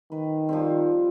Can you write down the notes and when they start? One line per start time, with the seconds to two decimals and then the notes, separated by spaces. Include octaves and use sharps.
0.12 D#3 B4
0.49 F3 G3 C4